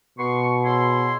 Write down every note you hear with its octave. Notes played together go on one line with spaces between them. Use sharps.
B2 B3 C6 C#6
C#3 E4 C6